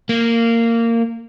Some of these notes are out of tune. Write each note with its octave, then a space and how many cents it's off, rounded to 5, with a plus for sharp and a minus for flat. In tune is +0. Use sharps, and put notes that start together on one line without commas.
A#3 -15